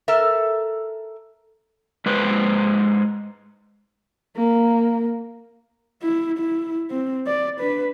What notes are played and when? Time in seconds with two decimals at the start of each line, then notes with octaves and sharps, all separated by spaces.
0.08 A4 A#4 E5
2.06 G#3 B4 C5
4.36 A#3
6.02 E4
6.38 E4
6.90 C4
7.27 D5
7.60 D4 B4